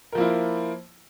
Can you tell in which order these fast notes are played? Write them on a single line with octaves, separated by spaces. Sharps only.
A#4 F3 A#3 E4 F4